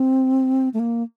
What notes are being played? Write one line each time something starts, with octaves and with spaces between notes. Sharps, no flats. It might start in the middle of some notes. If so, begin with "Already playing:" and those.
Already playing: C4
A3
A#3